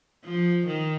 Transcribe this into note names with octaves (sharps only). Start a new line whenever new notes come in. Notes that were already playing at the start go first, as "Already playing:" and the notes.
F3
D#3